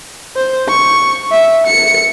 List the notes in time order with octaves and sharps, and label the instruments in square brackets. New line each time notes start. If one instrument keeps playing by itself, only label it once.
[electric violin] C5
C#6
E5
C#7